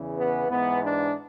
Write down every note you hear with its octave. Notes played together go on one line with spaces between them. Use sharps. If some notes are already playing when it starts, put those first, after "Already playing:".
Already playing: E2 C#3 E3
B3
G#2 E3 B3
D4